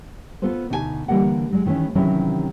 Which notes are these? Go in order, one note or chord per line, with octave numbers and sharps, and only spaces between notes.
B3 F4 A4 B4 C5
D2 B2 D#4 G4 G#5 A5
D3 E3 G3 A#3 A#4 F#5
F#3 G#3
D#3 E3 A3 B3 C#4
C3 D#3 E3 F#3 C#4 E4